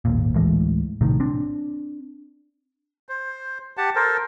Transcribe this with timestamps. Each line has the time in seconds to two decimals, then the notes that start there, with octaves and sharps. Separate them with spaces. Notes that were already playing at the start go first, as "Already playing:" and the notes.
0.05 G#1 D#2 A#2
0.35 D2 A2 E3 G#3
1.01 A#1 A2 C3 D#3
1.20 C4 D4
3.09 C5
3.77 G4 F#5 A5
3.95 A4 A#4 C5